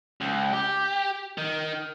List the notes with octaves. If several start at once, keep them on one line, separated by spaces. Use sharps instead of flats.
C#2
G4
D#3